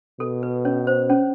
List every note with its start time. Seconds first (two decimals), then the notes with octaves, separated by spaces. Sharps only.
0.20 B2 A4
0.43 B4
0.65 C#4 C#5
0.87 C5
1.10 C#4 C#5